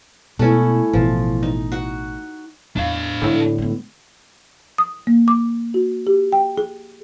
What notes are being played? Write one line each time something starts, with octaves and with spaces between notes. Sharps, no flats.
B2 G#3 A3 C#4 E4
A1 B2 E3 F3
D#4
F#4
E2 D4 F5
A2 D3 G#3 B3
G#3 B3
D#6
A#3
D6
F#4
G4
G5
G#4